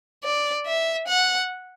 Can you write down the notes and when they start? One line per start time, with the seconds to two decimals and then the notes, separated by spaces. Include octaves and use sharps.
0.24 D5
0.66 E5
1.08 F#5